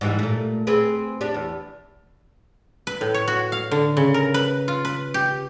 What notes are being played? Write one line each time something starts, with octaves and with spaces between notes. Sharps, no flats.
G#2 E3 G3
A#2 A3
C4 G#4 B4
D4 G4
E2
B4
A2
C#5
F#4
F5
D3
C#3
A#4
B4
F4
B4
G4